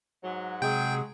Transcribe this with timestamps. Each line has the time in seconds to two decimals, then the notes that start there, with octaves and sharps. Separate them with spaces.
0.22 G#2 F#3
0.62 C3 F#3 G#3 G#4 G5